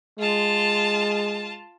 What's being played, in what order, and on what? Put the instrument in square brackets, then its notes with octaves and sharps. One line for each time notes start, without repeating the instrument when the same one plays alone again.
[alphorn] G#3 [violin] F4 A5